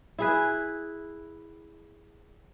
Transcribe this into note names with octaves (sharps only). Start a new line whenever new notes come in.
E4 G#4 B4